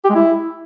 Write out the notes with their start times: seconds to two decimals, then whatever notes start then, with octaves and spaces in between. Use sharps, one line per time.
0.04 G4
0.10 G#3
0.15 E4